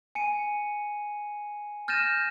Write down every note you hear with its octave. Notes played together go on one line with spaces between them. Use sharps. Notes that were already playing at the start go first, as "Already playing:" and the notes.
G#5 C#7 D#7
F6 G6 A6 A#6 D#7 E7